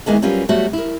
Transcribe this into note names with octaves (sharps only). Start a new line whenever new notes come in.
D#3 E3 G#3 A#3 B3
F#3 G3 C#4 F4 A#4 B4
F#3 G3 A3 B3 F#4
E4 A#4